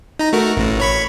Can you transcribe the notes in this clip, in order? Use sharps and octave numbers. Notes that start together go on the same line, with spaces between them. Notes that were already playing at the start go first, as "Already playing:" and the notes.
D#4 A#5
A3 F#4 A#4
A1 A2
C#5 B5 C#6